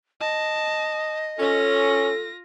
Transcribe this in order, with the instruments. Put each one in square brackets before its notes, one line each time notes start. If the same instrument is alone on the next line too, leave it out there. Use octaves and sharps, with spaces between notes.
[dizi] D#5 [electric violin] A5
[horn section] C#4 [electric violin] F4 A#6 [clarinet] A4